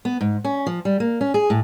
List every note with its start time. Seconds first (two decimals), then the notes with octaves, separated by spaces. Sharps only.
0.05 B3
0.21 G#2
0.44 C#4
0.66 F3
0.85 G3
1.00 A#3
1.21 C#4
1.34 G#4
1.50 A2